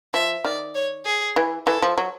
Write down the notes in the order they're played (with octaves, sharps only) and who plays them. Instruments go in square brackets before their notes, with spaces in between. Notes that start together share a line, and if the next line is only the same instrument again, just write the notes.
[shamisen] F3 [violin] E5
[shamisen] D#3 [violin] D5
[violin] C#5
G#4
[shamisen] E3
[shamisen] E3 [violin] A4
[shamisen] F3
F#3